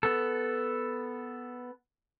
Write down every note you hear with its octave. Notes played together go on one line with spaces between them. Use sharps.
B3 A4